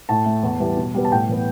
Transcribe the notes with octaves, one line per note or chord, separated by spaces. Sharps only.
A2 A5
A3
E2
E3 G3 B3
B2
G3 B3
A5
A2 G5
E3 B3